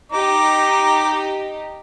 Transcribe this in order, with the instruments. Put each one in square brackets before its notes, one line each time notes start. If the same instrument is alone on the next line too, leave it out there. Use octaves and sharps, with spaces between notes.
[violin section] D#4 G4 [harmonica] A#5 D6